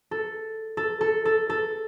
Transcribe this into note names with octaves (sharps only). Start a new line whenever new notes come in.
A4
A4
A4
A4
A4